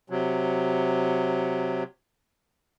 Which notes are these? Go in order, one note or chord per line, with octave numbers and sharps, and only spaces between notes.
C3 F#3